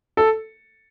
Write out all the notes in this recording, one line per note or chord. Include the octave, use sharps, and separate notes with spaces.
A4